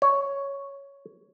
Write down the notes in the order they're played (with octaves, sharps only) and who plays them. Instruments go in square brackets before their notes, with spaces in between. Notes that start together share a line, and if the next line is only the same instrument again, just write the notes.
[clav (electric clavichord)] C#5